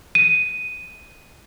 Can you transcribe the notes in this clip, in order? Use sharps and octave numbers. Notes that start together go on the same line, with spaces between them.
D#7